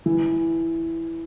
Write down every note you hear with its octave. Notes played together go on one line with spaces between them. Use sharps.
E3